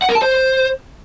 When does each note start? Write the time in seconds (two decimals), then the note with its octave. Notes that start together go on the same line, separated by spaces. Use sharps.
0.02 F#5
0.09 A#4
0.15 A5
0.22 C5